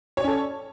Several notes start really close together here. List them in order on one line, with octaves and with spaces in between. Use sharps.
C#5 D5 C#4 A4